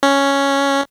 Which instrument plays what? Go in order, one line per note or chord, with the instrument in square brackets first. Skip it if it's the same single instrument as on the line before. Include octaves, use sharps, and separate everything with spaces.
[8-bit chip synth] C#4